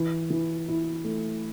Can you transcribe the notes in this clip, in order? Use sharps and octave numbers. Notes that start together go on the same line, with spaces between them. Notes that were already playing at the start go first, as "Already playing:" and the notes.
Already playing: E3
E3
E4
A3